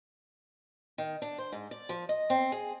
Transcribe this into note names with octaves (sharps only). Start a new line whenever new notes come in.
D#3
D4
C5
G#2
D5
F3
D#5
C4
G#4